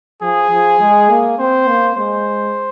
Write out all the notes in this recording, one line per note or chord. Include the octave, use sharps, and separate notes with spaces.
F3 G#4
F3
G#3
A#3
C4 C5
A#3
G#3 C5